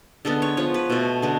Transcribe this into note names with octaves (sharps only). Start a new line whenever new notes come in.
D3 G#3 B3 A4
C#5
F3 B3 C#5
B4
B2 A3
D3 G#3 B3